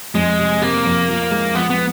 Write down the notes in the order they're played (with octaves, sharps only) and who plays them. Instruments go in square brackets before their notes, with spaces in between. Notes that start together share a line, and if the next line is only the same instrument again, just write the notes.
[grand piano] F2 [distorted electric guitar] G#3
[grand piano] C3
[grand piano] C3 [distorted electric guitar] A#3
[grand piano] F2
F3
G#3
[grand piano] F3 [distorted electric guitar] B3
[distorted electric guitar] B3